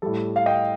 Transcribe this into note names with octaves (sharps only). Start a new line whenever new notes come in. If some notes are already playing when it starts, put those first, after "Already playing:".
A2 G3 A4
F5
D#5 G5